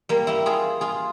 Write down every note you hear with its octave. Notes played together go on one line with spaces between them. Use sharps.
G3 A#3
E4 G4
F4 G#4
F4 G#4